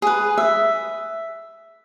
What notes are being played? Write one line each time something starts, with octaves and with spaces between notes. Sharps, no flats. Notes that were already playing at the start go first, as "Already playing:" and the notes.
G#4 B4
E5